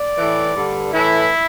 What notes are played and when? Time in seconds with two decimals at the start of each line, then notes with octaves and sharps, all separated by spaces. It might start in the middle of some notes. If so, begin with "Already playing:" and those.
Already playing: D5
0.18 A2 E3
0.55 G2 D3
0.93 A2 E3 E4